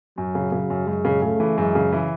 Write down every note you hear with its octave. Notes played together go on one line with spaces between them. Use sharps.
F#2 F#3
C#3
C#3
F#2
F#2 G#3
C#3
C#3 A3
E3
F#2 G#3
C#3
E3